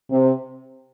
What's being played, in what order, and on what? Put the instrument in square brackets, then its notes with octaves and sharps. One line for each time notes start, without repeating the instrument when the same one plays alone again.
[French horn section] C3